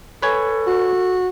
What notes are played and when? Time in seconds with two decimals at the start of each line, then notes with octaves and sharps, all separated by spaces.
0.22 A4 B4 C#5 G#5
0.67 F#4